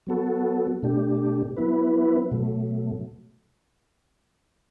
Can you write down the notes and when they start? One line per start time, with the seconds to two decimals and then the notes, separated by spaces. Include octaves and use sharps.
0.07 F#3 B3 F#4 A4
0.83 B2 A3 D4 G4
1.56 F#3 B3 E4 B4
2.31 B2 F#3 A3